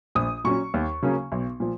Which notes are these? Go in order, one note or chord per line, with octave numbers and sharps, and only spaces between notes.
A#1 D#6
A#2 F#3 C#4 C#6
D#2
C#3 F#3 A#3 C#4
B1
A#2 F3